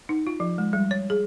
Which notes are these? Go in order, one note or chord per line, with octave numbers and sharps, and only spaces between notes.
D#4
F4
F3
G#3
G3
C#5
G#4